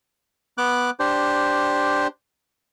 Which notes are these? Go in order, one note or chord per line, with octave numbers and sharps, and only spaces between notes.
B3 D6 F#6
D4 G4 C5